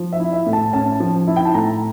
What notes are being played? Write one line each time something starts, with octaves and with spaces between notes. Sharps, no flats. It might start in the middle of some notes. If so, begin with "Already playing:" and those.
Already playing: F3
E5
E4
E5
A2
A5
C#4 A5
F3
E4
G5
A5
A2 A#5